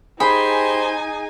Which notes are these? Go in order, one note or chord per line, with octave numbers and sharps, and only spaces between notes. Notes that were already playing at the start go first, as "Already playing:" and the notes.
D#4 G4 G#4 C5 G#5 B5